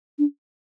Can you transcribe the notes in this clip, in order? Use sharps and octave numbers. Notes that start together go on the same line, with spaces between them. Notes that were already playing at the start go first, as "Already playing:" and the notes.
D4